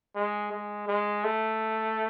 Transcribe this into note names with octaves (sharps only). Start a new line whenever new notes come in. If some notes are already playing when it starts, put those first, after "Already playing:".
G#3
G#3
G#3
A3